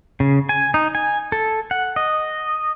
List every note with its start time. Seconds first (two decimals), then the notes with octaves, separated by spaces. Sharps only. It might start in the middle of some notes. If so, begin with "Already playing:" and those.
0.20 C#3
0.49 G#5
0.74 D#4
0.95 G#5
1.32 A4
1.71 F#5
1.96 D#5